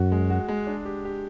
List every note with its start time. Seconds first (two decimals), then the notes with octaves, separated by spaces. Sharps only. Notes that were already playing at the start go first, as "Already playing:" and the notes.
Already playing: F#2 F#4
0.12 G#3
0.30 F#4
0.48 G#3
0.67 D4
0.85 G4
1.05 G4